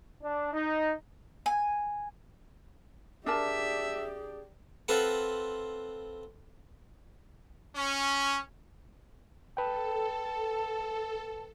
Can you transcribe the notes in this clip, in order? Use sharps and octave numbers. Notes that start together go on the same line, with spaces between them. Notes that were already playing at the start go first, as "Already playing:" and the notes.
D4
D#4
G#5
D4 G4 G#4 A#4 D5 E5 A5
C4 F4 A4 B4 F#5
C#4
A4 B4 G5 A5